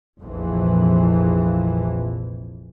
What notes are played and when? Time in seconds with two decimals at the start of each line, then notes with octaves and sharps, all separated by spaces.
0.20 F1 A#1 F2 E3 F3